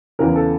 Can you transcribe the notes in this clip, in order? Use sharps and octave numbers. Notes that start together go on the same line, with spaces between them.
E2 C#3 E3 A#4
A4